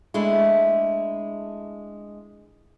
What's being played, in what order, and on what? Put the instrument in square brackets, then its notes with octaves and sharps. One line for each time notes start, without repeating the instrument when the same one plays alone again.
[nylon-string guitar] G#3 A3 D4 E4